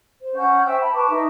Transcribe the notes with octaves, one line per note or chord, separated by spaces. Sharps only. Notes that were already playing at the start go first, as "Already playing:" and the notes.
C5
C#4 F#5 C#6 G6
C5 E5 G5 E6
A5 B5
B4 A5 C#6 D6
D#4 E5